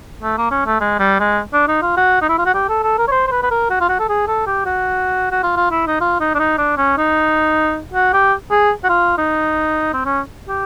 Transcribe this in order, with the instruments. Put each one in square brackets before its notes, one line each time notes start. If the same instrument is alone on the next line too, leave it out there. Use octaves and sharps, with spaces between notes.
[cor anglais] A3
A#3
C#4
A3
G#3
G3
G#3
D4
D#4
F4
F#4
D#4
E4
F4
F#4
G4
A4
A4
A#4
C#5
C5
C5
B4
B4
A#4
F#4
F4
F#4
A4
G#4
A4
G4
F#4
F#4
F4
F4
E4
D#4
F4
D#4
D4
D#4
D4
C#4
D#4
F#4
G4
G#4
F#4
F4
D#4
C4
C#4
G4